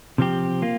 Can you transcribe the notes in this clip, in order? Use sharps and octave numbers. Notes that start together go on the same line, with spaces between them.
C3 F3 C4 G4
A#3 F4